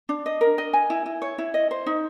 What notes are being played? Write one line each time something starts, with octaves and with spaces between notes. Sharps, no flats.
D4
D#5
A#4
D#5
G#5
E4
E4
C#5
E4
D#5
C5
D#4